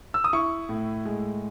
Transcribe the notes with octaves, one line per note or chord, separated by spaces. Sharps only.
E6
D#6
E4 C#6
A2
G#3